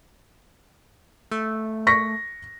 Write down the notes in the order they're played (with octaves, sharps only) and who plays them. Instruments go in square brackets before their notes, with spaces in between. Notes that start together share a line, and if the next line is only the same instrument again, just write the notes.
[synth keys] A3
[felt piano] C#6 A#6 B6